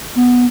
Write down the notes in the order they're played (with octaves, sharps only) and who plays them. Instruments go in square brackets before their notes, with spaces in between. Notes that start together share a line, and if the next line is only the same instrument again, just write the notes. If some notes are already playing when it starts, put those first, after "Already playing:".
[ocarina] B3